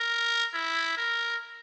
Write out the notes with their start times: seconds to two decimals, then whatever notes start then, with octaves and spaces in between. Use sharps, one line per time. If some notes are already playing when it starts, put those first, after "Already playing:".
Already playing: A#4
0.53 E4
0.97 A#4